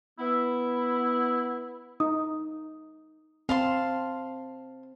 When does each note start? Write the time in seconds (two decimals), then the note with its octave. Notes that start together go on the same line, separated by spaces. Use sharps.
0.19 B3 E4
2.00 D#4 D#6
3.49 C4 F5 A5 C6